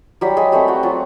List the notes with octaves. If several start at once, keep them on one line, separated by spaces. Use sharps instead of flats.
F#3 G3 G4
G#3 G#4
G3 A3 C4 G4
F#4
F#3 F4